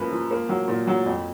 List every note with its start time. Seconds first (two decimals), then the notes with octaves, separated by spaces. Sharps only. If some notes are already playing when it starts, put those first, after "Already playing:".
Already playing: F#2 F3 A#3 B4
0.11 F3
0.31 A#3
0.49 F#3
0.68 A#2
0.87 F#3
1.06 F2